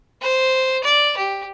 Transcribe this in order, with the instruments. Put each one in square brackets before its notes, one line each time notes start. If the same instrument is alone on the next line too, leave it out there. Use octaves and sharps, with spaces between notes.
[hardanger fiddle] C5
D5
G4